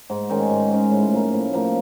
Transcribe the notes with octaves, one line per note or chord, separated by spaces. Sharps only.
G#2
D#3 G#3 C#4
G#2
D#3 G#3 C#4
A2
F3 A#3
A2
F3 A#3